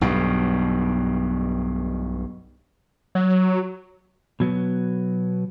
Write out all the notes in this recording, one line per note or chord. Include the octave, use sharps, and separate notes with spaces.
B1 G2 B2
F#3
B2 F#3 B3